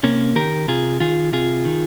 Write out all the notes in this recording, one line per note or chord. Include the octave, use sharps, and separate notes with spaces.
C3 A#3 C#4
D#3 G4 A#4
C3 F4 G#4
D#3 F4 G#4
C3 F4 G#4
D#3